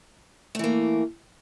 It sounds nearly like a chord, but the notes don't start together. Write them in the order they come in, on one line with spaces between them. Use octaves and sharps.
A3 E3 A#3